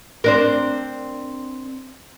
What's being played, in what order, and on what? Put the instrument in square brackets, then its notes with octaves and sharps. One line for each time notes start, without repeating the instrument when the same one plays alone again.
[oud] C4 D4 A#4